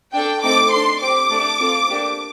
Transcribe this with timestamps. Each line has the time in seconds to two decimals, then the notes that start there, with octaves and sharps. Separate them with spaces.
0.14 D4 A4 G5
0.43 A3 C4 D#4 A4 D6
0.72 D4 A4 C6
1.01 C4 G4 D6
1.31 A3 D4 A4
1.60 C4 F4 A4
1.89 A#3 D4 G4